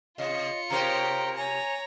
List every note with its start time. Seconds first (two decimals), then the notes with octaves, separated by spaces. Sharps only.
0.18 C3 F4 D#5 C#7
0.70 C3 C#4 G4 A#4 C5 G5 A#5
1.37 C#5 G#5 A#5